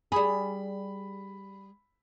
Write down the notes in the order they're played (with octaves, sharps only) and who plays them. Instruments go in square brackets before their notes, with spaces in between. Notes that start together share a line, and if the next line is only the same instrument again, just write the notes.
[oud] G3 G#4 [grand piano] B5